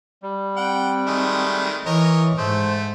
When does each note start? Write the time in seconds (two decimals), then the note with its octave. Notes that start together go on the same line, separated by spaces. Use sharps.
0.23 G3
0.57 C4 F#5 G5
1.07 D#3 G#3 A3
1.86 E3 A#4 C#5 D#5
2.38 G#2 A3 C5